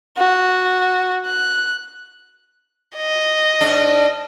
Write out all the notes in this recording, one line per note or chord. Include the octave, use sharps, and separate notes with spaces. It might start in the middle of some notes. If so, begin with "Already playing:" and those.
F#4
F#6
D#5
G#2 D4